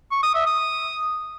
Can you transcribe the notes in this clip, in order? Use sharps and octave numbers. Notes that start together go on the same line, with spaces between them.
C#6
D#6
E5
D#6